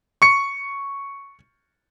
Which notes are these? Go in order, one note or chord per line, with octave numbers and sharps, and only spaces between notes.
C#6 C#7